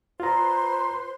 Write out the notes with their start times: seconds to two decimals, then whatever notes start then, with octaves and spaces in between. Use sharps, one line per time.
0.20 F4 B4 C5 A#5 C6